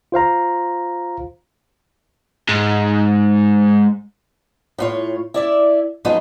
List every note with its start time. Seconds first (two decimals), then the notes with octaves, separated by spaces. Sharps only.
0.12 F4 C5 F5 A#5
2.48 G#2
4.78 A2 F4 C#5
5.34 E4 D5 E5
6.05 F3 F#3 G#3 B3 D#4 F4